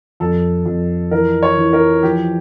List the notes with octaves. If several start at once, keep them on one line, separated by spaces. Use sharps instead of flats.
F2 A4
F2
E3 A#4
C#5
E3
A#4
F3 G4